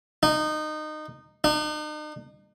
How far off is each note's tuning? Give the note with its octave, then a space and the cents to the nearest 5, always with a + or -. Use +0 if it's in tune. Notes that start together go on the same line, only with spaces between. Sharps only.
D#4 -20
D#4 -40